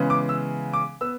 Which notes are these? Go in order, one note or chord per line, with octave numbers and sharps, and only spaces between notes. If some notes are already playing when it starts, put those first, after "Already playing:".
Already playing: C#3 E3 G#3 B3
D6
E6
D6
B3 E6